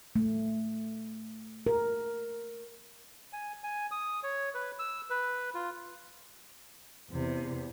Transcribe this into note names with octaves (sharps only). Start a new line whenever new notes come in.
A3
A#4
G#5
G#5
D#6
C#5
B4
E6
B4
F4
E2 C3